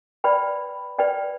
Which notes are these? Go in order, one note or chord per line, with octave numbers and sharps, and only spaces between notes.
B4 D5 G5 B5
B4 D5 G5